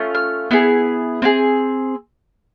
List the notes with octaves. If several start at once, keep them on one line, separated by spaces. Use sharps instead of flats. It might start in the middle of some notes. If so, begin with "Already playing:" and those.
Already playing: A3 C#4 F4
F6
B3 E4 G#4
C4 E4 G#4